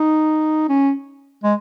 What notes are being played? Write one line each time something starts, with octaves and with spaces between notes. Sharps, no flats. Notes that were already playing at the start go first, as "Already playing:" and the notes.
Already playing: D#4
C#4
G#3